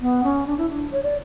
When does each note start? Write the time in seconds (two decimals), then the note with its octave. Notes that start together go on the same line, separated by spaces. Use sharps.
0.01 B3
0.23 C#4
0.47 D4
0.58 E4
0.70 D4
0.92 C#5
1.03 D5